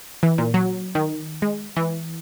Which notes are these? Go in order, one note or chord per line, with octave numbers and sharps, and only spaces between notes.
E3
A#2
F#3
D#3
G#3
E3